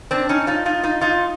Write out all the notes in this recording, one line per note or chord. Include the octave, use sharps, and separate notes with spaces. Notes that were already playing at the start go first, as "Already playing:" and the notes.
C4 D4
C#4 D#4
D#4 F4
D#4 F4
D#4 F4
D#4 F4